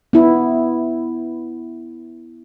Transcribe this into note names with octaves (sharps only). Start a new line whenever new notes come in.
B3 E4